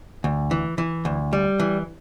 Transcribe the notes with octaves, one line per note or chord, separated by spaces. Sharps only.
D2
E3
E3
D2
G3
E3